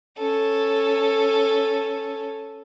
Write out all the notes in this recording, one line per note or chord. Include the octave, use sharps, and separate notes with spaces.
C#4 A4